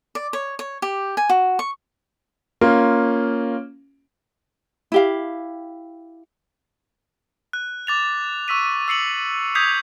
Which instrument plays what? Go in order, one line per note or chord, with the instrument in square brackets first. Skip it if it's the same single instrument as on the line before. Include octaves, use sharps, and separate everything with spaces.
[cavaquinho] D5
C#5
C#5
G4
G#5
F#4
C#6
[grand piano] A#3 C#4 F4
[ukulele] E4 G4 F5
[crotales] F#6
D6 A6 F7
C#6 E6 B6 D#7
E6 C7 C#7 F#7
D#6 G6 G#6 B6 C7 F7